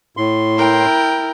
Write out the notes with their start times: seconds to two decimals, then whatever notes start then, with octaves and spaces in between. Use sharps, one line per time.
0.17 A2 C6
0.58 E4 A#4 G5